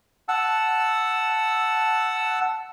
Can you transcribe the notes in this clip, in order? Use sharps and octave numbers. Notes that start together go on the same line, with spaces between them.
F#5 A5 E6